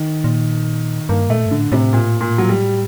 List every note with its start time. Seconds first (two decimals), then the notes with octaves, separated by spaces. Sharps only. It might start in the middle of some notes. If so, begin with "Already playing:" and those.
Already playing: D#3
0.24 A#2
1.09 G2 A#3
1.29 A#2 A3
1.46 G2
1.51 A2 D3
1.72 A2 C3
1.93 A#2
2.21 A#2
2.38 F#3
2.49 G3